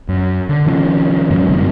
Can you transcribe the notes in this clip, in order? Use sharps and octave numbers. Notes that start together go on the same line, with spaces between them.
F#2
D3
C3 D#3 F3 C#4
F2 G#2 F#3 C#4
G1 F#2 C3 D#3